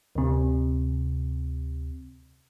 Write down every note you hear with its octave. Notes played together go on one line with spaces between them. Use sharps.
D2 C3